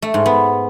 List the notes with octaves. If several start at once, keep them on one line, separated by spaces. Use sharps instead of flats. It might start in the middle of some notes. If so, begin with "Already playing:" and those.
A3
G#2
B3